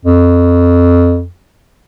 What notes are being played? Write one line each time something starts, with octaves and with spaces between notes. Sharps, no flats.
F2